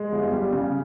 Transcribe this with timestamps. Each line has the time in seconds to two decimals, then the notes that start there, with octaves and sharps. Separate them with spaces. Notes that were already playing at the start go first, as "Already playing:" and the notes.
Already playing: G#3
0.13 G1
0.32 G3
0.52 C#3